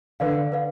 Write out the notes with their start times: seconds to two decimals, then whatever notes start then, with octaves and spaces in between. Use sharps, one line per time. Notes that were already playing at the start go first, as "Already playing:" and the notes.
0.20 D3 B4 D5 F5
0.52 B4 D5 F5